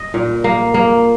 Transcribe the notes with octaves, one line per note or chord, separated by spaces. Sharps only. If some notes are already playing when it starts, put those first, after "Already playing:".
Already playing: D#5
A#2
A#3
A#3